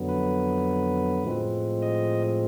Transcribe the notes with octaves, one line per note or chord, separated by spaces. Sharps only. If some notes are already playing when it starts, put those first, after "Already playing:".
Already playing: F2 D3 F#3 B3
B4
A2 F3 G#3 C4
D#5